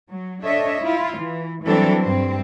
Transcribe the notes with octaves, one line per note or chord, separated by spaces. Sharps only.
F#3
D4 A4 C#5 D#5 E5
E4 F4
E3
E3 F#3 G3 C4 D4 A4
G2 C4